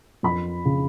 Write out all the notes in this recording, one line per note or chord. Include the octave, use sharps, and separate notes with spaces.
F2 B5
C#3